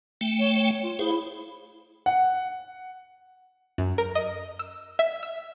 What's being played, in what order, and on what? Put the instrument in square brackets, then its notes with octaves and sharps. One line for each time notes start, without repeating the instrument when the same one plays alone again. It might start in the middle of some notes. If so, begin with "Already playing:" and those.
[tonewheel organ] A3 G5
[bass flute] C#5
C#5
F4
[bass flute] E4 [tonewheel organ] G#4 C5 F5
[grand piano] F#5
[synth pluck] F#2
A#4
D#5
E6
E5
E6